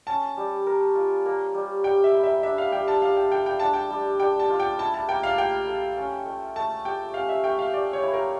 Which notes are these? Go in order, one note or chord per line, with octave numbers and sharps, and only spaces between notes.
C#4 A5
G3
A#4
F4
A#3
G3
G3 G5
E5
E4
E5
D4 E5
F5
G3 G5
A5
G3 F5
G5
A4 G5
G5
D4 A5
G5
G3
G3 G5
A5
F4
G5
E4 A5
A5
A#3 G5
F5
A#3 G5
A4
C#4
A3
A3 A5
G4 G5
C#4 F5
E5
A3 G5
F5
G4 D5
C#5
E4
A#4